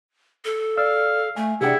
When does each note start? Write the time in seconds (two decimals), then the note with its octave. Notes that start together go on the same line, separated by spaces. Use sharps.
0.45 A4
0.78 D5 F5 E6 F6
1.36 A3 G#5
1.61 C3 D4 E4 G4 G#4 D5 F#5 G5